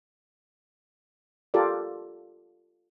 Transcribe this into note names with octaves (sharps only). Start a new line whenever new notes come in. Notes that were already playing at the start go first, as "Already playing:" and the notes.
F4 G4 A4 A#4 D5